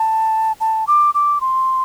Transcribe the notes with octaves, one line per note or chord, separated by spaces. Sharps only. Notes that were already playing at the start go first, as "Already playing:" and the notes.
Already playing: A5
A5
D6
D6
C6